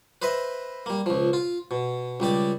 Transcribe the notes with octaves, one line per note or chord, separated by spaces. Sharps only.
B4 C5 D#5 E5
G3 A#3
C#2 F3
F4
B2
C#2 G3 G4 D5